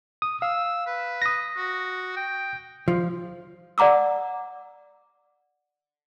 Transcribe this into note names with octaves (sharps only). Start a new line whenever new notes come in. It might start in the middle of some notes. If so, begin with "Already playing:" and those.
D#6
F5 E6
B4
D#6 A#6
F#4
G5
F3
D5 F#5 A#5 D6 E6